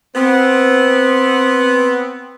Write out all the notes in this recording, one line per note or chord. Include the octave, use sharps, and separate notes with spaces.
B3 C4